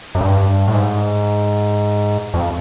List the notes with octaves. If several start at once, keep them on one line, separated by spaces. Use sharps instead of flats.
F#2
G2
A2
G#2
F2